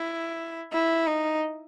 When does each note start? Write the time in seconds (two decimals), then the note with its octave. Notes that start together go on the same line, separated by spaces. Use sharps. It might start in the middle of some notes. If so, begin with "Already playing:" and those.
Already playing: E4
0.72 E4
1.07 D#4